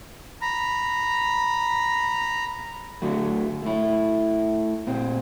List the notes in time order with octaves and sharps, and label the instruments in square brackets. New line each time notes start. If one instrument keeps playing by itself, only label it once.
[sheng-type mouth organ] A#5 B5
[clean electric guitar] D3 F#3 A3
A3 E4
A#2 C4